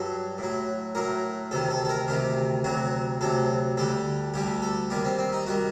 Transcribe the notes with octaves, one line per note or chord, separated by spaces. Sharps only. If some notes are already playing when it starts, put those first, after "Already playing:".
Already playing: G2 F#3 A4
A2 F#3
A2 F#3 A#4
D2 C3 D#3 A4
A4
A4
A#4
D2 C3 D#3 G4
D2 C3 F#3 F#4
D2 C3 F#3 A4
D2 D3 G3 A4
D2 D3 G3 G4
A4
D#2 D#3 G3 G4
C4
C4
D#4
D#3 G3 F#4